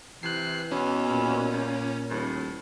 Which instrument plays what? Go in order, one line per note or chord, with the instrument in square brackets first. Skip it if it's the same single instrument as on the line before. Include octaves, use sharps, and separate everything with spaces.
[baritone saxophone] C3 [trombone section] E3 [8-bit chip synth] F#6 C7
[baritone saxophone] E2 [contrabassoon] B2 [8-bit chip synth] C#4
[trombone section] A#2
[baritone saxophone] C#2
[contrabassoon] D#1 [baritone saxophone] A2